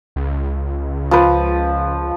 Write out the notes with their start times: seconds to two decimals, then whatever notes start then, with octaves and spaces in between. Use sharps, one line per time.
0.16 C#2
1.11 F3 B4